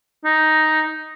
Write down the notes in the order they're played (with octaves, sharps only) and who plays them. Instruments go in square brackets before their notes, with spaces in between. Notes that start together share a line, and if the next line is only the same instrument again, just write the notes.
[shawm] D#4